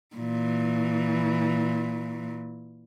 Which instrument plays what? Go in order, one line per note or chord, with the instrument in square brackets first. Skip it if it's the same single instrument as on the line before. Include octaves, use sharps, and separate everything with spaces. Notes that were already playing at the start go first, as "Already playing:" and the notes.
[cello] A#2 E3